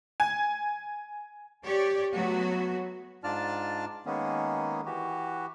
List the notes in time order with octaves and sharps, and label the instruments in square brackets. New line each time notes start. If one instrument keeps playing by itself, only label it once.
[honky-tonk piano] G#5
[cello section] G4 C#5 D5
F#3 A3 B3 F#4
[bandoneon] G#2 D4 F4 D5 A5 F6
D#3 G#3 A#3 B3 C#4
E3 F#4 G4